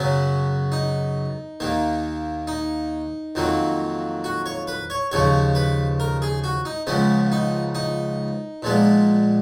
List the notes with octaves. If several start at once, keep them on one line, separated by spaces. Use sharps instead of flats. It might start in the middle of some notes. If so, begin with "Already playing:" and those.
Already playing: F#2 C#3 F#3 B3 C#4
D#4
D#2 D#3 A#3
D#4
F2 D#3 F#3 A#3
F#4
C#5
B4
C#5
D#2 C#3 F3 C#5
B4
A#4
G#4
F#4
D#4
C#2 C#3 F3 B3 C#4
D#4
D#4
A#2 F3 G#3 B3